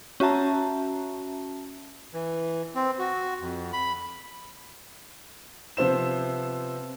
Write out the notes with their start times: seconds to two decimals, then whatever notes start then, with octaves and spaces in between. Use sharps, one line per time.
0.20 C#4 F#4 E5 A5 A#5
2.14 E3
2.75 C4
2.99 F#4
3.40 F2
3.73 B5
5.77 C3 F3 B3 C5 E6 E7